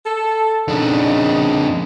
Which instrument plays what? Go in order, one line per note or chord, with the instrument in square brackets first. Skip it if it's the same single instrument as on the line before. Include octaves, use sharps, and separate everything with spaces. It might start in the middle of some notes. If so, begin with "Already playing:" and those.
[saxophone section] A4
[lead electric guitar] F2 D4 [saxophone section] C#3 D#4